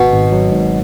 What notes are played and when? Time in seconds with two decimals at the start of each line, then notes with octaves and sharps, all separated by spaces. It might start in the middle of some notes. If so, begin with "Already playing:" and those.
Already playing: G#1 B2
0.11 G#1
0.32 F#3
0.51 G#2